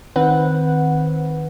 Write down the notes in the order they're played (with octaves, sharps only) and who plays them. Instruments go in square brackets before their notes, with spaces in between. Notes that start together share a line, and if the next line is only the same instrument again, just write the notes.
[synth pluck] D#3 C4 B4 F#5